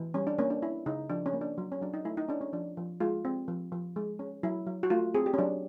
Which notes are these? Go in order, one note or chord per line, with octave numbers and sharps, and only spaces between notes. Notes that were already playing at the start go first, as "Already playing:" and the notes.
Already playing: E3
G3 C#4
D4
A#3 C#4
D4
C#4 E4
C#3 D#4
F3 D4
C#4
A#3
D4
F#3
C#4
F#3 D4
D#4
A3 E4
D#4
C#4 D4
C#4
F3 D4
F3
G#3 F4
C4
F3
F3
G#3
C#4
F#3 E4
F#3
F#4
A3 F4
C4 G#4
G4
C#4
F#3 D4